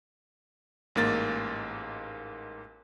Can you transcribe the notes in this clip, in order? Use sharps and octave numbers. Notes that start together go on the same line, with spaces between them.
A1 G#2 A#3 A6